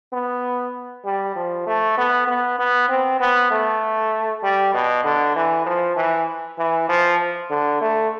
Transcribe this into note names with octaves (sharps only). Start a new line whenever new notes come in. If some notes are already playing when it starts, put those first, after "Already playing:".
B3
G3
F3
A3
B3
B3
B3
C4
B3
A3
G3
B2
D3
E3
F3
E3
E3
F3
D3
A3